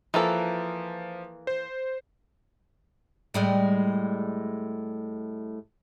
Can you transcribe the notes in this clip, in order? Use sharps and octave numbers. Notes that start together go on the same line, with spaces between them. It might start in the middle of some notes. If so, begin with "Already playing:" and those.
E3 F3 A#3 A4
C5
A2 G3 G#3